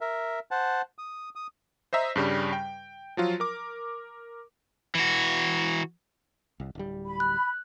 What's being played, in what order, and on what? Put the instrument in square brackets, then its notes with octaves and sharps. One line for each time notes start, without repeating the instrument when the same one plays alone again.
[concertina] A#4 E5
C5 F#5 A5
D#6
D#6
[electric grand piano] C5 D#5 E5 A#5
G2 C#3 G3
G5
F3 F#3 F4
A#4 D6
[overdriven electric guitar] E3 F#4
[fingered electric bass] C2
D1 G3
[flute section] B5
[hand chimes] F#6